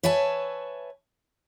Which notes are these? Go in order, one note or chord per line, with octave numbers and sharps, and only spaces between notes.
B4 C#5 E5 G#5 A5